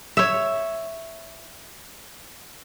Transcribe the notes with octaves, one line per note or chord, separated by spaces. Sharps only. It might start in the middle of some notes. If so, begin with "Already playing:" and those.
C#5 E5